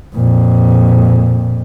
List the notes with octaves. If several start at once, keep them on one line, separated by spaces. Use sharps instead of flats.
F2 A#2